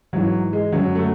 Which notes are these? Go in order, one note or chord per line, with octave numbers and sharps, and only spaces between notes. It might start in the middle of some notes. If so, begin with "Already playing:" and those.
G#2 E3 F#3
G#3
F#2 D3 F#3
A3